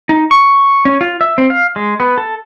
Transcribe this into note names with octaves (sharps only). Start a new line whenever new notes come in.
D#4
C#6
C#4
F4
E5
C4
F5
G#3
B3
A4